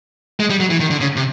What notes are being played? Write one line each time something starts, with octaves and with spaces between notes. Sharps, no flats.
G#3
G3
F#3
E3
D#3
D3
C#3
C3